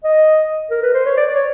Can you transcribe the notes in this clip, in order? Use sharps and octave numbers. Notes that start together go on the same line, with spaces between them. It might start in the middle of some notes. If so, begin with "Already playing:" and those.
D#5
A#4
B4
C5
C#5
D5
C#5